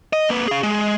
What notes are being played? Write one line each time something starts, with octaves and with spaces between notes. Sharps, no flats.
D#5
A#3 B4
G#4 F5
G#3